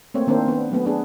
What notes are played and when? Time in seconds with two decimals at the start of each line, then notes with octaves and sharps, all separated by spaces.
0.14 A3 A#3 C4 C#5
0.27 D#3 A#3 C4 D4 C5
0.48 B3 D4
0.71 F#3 A3 B3
0.85 B3 D4 G#4